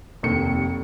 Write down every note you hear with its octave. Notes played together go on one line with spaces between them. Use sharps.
F1 D#2 C#7